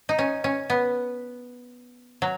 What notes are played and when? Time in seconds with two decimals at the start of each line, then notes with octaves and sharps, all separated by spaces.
0.09 D#4
0.19 C#4
0.44 C#4
0.70 B3
2.22 F#3